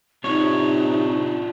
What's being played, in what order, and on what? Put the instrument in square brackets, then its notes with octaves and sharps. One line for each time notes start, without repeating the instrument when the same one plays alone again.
[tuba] C3 [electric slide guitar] D4 F4 F#4 [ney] D#4 [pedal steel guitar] C#5